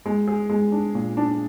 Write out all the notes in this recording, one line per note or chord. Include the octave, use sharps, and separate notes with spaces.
G#3
G#4
G#3
D4
A#2
D4